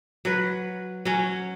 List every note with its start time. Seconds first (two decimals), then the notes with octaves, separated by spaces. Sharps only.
0.25 F#3 B4
1.05 F#3 C#4